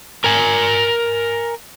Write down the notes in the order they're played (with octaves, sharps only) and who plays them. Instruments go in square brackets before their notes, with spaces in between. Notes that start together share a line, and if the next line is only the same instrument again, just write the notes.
[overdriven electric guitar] A#4 G#5